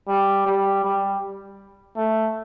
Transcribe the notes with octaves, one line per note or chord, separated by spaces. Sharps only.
G3
G3
G3
A3